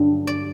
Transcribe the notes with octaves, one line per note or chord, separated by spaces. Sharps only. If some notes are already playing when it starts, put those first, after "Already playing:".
Already playing: G2 D3 F#3
D5